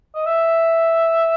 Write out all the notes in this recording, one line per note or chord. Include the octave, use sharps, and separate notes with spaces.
D#5
E5